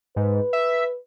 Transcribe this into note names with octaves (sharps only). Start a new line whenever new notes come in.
G#2 B4
E5